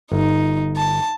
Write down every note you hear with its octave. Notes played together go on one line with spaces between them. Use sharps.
G1 D#4
A5